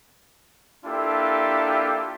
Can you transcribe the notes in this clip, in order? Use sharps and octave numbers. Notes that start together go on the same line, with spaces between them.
A#3 D4 E4 F4 G4 A4